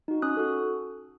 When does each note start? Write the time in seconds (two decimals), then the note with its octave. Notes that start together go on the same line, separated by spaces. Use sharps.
0.08 D#4 F#4
0.22 C#4 D#6 F#6
0.37 F#4 A4